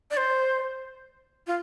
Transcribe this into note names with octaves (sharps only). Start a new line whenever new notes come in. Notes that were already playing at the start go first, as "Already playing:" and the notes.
D5
C5
F4